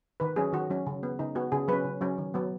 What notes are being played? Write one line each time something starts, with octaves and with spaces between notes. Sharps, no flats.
D#3 B4
F#3 C#4 G#4
D#3 F#4
F#3 C#4
C#3
B3
C#3 D#4
B3 F#4
C#3 G#4
F#3 C#4 B4
C#3
F#3 C#4
D#3
F#3 B3